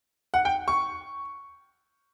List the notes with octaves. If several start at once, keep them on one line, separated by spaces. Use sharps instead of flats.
F#5
G5
C#6